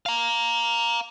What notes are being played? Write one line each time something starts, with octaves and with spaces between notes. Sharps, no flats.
F5 A#5